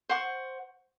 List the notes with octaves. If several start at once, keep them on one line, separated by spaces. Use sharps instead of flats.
C5 F#5 C#6